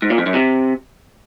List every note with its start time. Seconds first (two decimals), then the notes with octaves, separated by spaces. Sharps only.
0.02 G#2
0.10 A#2
0.18 F2
0.26 F#2
0.34 C3